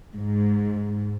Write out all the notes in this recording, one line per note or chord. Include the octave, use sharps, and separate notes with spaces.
G#2